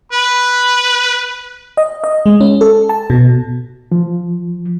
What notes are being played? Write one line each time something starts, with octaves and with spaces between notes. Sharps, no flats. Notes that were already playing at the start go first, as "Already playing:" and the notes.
B4 B5
D#5
D#5
G#3
C#4
A4
A5
B2
F3